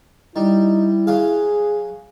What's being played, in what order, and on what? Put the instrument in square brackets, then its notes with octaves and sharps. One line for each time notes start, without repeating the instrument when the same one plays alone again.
[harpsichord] G3 [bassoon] D#4 [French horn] E4
[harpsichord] F#3 F5 [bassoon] G#4